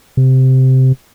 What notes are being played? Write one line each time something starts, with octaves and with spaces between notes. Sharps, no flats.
C3